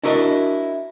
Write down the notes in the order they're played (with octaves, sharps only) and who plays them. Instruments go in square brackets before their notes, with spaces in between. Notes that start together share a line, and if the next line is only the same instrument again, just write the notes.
[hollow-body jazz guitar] D4 E4 F#4 A#4 D#5